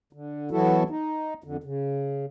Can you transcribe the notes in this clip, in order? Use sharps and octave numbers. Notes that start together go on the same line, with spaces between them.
D3
E3 F#3 B3 E4 F#4 A4
D#4
F2 D3
C#3